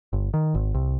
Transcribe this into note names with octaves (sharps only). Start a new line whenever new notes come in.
G1
D#3
G#1
C2